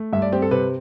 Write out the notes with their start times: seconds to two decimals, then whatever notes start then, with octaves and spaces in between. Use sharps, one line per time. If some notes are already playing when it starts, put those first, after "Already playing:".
Already playing: A3
0.13 G2 E5
0.22 D5
0.33 C4 G4
0.42 A4
0.51 C3 B4